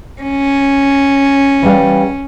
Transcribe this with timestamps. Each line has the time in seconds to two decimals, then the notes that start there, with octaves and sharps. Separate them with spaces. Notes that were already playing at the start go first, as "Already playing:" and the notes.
0.22 C#4
1.62 E3 G3 F5